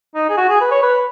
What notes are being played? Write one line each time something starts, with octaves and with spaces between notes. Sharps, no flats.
D#4
G#4
F#4
G#4
B4
C#5
B4